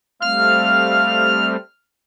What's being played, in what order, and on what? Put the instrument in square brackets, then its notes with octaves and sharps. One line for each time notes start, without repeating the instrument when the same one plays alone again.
[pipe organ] G3 A3 C4 [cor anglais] F5 [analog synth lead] F6